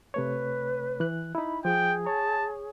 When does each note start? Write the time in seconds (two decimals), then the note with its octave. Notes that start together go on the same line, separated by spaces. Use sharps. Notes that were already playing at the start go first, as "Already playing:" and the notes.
0.14 C3 A3 B4 C#5
1.00 E3 F#6
1.35 D#4 E4 B5
1.65 F3 G#4 G5
2.07 C#5 A5